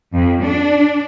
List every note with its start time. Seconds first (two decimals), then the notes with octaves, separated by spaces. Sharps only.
0.13 F2
0.43 D4